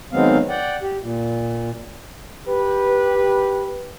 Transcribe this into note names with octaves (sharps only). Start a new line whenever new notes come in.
D#3 F#3 G#3 B3 C4 F5
D5 F#5 G5
G4
A#2
G4 B4